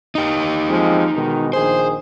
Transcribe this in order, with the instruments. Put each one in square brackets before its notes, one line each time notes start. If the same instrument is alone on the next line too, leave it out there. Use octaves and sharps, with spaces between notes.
[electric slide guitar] D#4 G4
[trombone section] F3 G#3 C4
B2 D#3 G#3
[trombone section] A#1 D#3 G#4 [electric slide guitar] C5